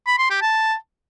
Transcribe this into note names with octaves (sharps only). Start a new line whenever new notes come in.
B5
C6
G4
A5